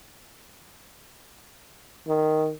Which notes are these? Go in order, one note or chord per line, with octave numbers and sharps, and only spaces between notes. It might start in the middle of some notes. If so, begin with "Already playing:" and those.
D#3